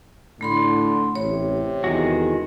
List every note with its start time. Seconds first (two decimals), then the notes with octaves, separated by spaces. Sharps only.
0.41 A2 D3 A3 B5 C6
1.15 A1 C3 C#5
1.84 E2 D#3 G#3 F#4